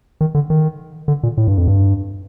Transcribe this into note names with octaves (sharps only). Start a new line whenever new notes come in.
D#3
D3
D#3
D3
A#2
A2
G2
F2
G2